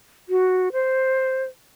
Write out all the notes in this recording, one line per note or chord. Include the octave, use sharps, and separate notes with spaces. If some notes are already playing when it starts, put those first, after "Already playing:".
F#4
C5